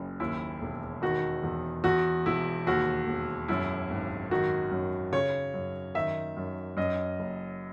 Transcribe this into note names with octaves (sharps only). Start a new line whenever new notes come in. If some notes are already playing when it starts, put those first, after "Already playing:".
Already playing: F#1 F#2
D#2 E4
E1
D#3 F#4
E2
E2 F#4
E1 E4
D#2 F#4
E1
F#2 E4
G#1
D#3 F#4
F#2
C#3 C#5
F#2
D#3 E5
F#2
F#2 D#5
F#1